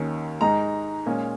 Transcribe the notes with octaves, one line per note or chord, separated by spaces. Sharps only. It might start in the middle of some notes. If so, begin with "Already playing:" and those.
Already playing: D#2 D#3 C#4
G#2 G#3 D#4 A#5
A#2 G#3 C#4